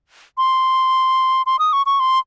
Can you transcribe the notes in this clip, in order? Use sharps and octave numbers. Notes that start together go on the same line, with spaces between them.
C6
C6
D#6
C#6
C#6
C6